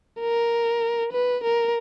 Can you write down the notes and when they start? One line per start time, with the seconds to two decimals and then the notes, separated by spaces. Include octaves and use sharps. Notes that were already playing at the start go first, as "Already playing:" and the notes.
0.20 A#4
1.12 B4
1.43 A#4